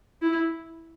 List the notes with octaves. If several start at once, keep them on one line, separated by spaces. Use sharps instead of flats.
E4